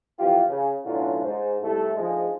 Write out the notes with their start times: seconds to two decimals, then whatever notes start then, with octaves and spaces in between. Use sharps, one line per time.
0.18 F2 E3 F4 G4
0.50 C#3
0.85 B1 A2 D3 F#3 C#4 F4
1.24 G#2 C5
1.62 C2 A3 A4
1.95 D2 G#2 F3 G#3